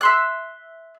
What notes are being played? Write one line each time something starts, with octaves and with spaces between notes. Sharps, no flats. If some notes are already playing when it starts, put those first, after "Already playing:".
E5 C6 F#6